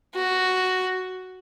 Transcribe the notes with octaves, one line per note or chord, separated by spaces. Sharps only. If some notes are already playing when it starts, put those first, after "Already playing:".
F#4